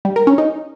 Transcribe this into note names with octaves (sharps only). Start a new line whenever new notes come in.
G3
A#4
C#4
D#4